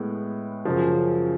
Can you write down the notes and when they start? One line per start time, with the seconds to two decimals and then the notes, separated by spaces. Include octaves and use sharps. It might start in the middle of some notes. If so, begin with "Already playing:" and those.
Already playing: A2 G#3 B3
0.65 F#2 C#3 F3